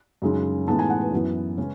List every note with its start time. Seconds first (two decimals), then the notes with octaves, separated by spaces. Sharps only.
0.22 F#2 C#3 G#3 D#4
0.67 A2 E3 G#3 B3 D#4 A5
0.79 G#5
0.90 F#5
1.01 B4
1.12 F#2 E3 B3 E4
1.58 C#3 G#3 C#4